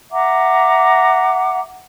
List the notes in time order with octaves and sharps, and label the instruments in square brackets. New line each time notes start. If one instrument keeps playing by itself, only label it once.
[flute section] E5 F#5 A#5 D6